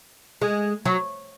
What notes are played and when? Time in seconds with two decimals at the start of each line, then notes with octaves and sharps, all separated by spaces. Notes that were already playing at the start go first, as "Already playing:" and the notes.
0.42 G#3
0.85 F#3